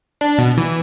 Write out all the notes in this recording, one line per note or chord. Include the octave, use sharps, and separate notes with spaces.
D4
B2
E3